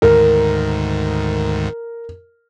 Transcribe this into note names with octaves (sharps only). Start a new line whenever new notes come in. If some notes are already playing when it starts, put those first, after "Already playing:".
D2 G#2 D#3 A#4